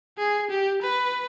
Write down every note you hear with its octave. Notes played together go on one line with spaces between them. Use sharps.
G#4
G4
B4